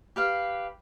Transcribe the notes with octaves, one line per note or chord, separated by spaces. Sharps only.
G4 B4 F5